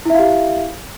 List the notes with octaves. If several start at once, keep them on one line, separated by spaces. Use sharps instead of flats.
E4 G4 E5 F5